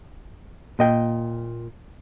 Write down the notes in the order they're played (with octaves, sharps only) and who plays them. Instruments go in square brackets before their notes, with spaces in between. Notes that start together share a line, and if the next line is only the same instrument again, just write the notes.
[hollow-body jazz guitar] A#2 D#5 G5